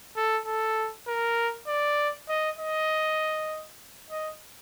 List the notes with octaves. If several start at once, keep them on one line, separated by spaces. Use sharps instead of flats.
A4
A4
A#4
D5
D#5
D#5
D#5